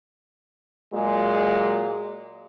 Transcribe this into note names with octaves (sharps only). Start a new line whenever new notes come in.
A#2 F#3 G#3